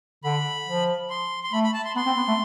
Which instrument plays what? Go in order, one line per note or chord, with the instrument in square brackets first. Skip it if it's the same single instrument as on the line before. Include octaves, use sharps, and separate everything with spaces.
[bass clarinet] D3 [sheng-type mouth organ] B5
[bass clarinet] F3
[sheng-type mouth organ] C6
C6
[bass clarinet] A3 [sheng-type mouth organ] B5
[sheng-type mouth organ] B5
A5
C6
[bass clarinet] B3 [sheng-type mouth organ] C6
[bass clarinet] C4
B3
A3